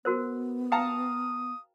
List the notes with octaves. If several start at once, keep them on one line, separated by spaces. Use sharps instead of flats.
B3 F#4 A#4 C5
F5 G5 A5 A#5 D#6